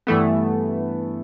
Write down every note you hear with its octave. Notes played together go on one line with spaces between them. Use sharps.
G2 E3 A3 B3